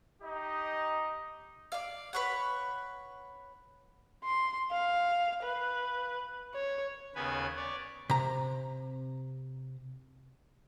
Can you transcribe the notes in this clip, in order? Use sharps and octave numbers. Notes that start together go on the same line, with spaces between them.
D#4 G4 D#5
D5 F5
B4 C#5 F#5
C6
F5
B4
C#5
D#2 C#3 B3 B4 G#5
C#5 D5
C3 A#5